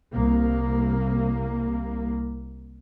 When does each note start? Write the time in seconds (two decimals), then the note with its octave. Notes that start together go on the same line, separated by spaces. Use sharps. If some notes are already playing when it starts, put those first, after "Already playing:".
0.12 C2 A#3